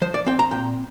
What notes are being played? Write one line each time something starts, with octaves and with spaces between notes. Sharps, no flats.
F3 C5
D5
C4 G5
A#5
A#2 G5